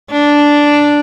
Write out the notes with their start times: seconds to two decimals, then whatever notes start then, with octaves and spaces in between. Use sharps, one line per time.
0.11 D4